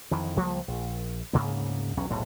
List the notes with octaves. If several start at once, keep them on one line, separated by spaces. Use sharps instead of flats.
F2 D#3 E3
C#2 F3 G3 A#3
A#1
D2 G#2 C#3 A#3
B1 E2 F#3 C#4
E1 B1 A2 C3